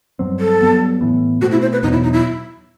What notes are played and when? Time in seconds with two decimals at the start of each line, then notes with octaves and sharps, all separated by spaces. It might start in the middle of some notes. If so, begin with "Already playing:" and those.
0.19 G2 F#3 C4
0.40 A4
0.61 G2 F#3 B3
1.01 A2 E3 B3
1.41 B2 A3 C4 F#4
1.52 E4
1.62 C5
1.72 B4
1.83 E2 B2 F#3 D#4
1.92 E4
2.03 D#4
2.13 E4